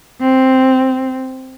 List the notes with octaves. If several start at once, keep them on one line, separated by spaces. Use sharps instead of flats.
C4